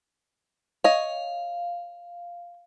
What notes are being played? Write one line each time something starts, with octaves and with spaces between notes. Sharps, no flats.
C#5 D#5 F5